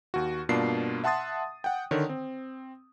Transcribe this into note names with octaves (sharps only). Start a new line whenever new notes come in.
D#2 F#4
G2 B2 A#3 D4 F4 C7
E5 F#5 A5 C6 D#6 A6
F#5 G5
D3 D#3 C#5
C4